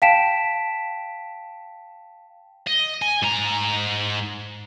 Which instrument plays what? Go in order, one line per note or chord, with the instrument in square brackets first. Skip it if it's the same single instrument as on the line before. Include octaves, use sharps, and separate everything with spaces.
[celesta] F5 G5 A5 B6 D7 E7
[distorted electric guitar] D#5
G#5
G#2 A#5